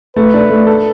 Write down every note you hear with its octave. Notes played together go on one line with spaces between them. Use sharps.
A3 B4
D4
A3
A4